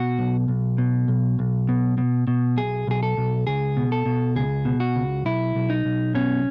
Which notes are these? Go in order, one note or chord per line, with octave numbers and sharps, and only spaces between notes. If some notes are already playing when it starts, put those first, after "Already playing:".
Already playing: B2 F#4
B1
B1
B2
B1
B1
B2
B2
B2
B1 G#4
B1 G#4
A4
B1
C#2 G#4
B2
A4
B2
C#2 G#4
B2
F#4
C#2
B1 E4
B1
D#4
B1
B2 C#4